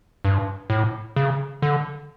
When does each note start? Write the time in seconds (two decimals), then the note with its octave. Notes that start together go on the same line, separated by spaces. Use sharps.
0.25 G2
0.70 A2
1.16 C#3
1.62 D3